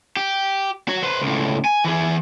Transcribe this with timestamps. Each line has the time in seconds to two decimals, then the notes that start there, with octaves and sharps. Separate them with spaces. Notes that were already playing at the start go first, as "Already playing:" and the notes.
0.17 G4
0.88 F#4 C#5
1.03 B4 C5
1.22 C#2 A2
1.65 G#5
1.85 E3 G#4